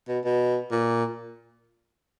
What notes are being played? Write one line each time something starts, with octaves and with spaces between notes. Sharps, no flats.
B2
B2
A#2